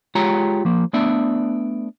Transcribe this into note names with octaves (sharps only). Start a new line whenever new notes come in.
G#3 F4 G4 C#5 A#5
F3 A#3
A3 B3 D4 D5 E5